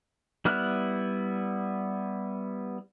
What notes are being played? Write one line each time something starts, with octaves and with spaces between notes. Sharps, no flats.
G3 B3 E4 F6 F#6